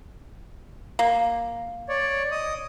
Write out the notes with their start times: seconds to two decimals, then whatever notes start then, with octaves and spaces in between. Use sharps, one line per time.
0.99 A#3
1.89 C#5 D5
2.31 D#5 D#6